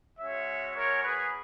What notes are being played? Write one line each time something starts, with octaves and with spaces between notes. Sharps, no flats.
G#3 C#4 F#4 C#5 E5
A#4 C#5
G#4 B4